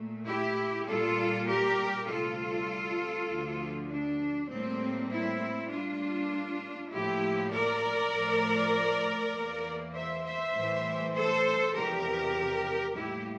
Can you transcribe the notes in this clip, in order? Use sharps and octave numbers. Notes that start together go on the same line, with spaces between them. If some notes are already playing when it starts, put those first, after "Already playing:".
Already playing: A#2 A3
E4 G4
A#2 G3 A#3 F4 A4
G4 A#4
D2 C3 G3 F4 A4
D2 D3 F3
D4
A2 G3 A#3 C4
C4 E4
A2 G3 A#3 D4 F4
A2 F3 A#3 E4 G4
A#4 D5
A2 F3 A3
E2 E3 A#3
C5 E5
C5 E5
A2 E3 G3
A4 C5
E2 C3 F3 G4 A#4
A2 G3 A#3 E4 G4